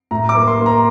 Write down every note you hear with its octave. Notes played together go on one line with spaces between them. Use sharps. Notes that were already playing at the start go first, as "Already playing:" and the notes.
A2 A#5
D6
A#3
C6
A#3
A#5